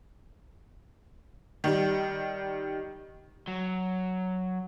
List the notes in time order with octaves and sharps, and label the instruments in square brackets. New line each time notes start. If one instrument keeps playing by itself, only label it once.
[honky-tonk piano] D#3 G3
[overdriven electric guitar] F#3